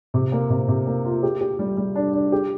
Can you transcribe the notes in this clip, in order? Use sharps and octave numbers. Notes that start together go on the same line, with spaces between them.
C3
A#3
C3
C3
A#3
F4
G4
G4
G3
G3
D4
D4
G4